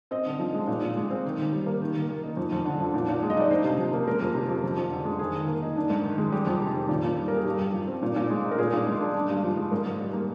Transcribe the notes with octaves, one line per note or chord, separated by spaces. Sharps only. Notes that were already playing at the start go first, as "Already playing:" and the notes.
C4 D#5
D3
F3
G#3
A#2
A#2
G#3
C4
D#3
D#3
G3
A#3
D#3
D#3
A#3
D#4
F2
F2
D3
F3
A#2
A#2
G#3
D#5
D#4 D5
D4 C5
C3
F3
A#3
G#3 A#4
F2
C3
F3
F2
F2
D3
G#3
D#3 G#4
D#3
A#3
D#4
D4
G#2
D#3
G#3
G3 G4
F2
C3
D#3
A#2
A#2
G3
A#4
A#3 G#4
G2 G4
G2
F3
C4
A#2
A#2
G#3
D#4
A#4
A#2 G#4
A#2
G#3
D4
D4
G2
F3
G#3
G#2 A#4
G#2
G3
A#3